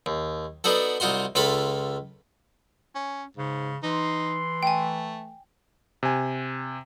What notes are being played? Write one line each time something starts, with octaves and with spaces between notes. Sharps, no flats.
D#2
B3 D4 D#4 F#4 A4
C2 D#4 F4 F#4 C6
C#2 F4 A4 A5 B5
C#4
G#2 C#3
E3 D#4 C6
A3 G5 G#5
C3 G#5